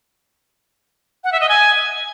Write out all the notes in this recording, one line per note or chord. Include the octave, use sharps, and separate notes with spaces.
F#5
E5
D#5
G#5